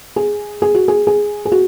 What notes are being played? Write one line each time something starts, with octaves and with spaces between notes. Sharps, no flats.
G#4
G#4
F#4
G#4
G#4
G#4
F#4